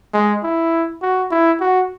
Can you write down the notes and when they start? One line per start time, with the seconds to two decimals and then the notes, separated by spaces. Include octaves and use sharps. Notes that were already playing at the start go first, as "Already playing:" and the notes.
0.13 G#3
0.43 E4
1.02 F#4
1.31 E4
1.61 F#4